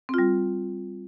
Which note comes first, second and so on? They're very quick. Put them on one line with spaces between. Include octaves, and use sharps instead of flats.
C4 F4 G3